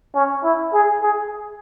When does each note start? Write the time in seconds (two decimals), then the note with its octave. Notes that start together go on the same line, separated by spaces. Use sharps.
0.15 C#4
0.44 E4
0.73 G#4
1.03 G#4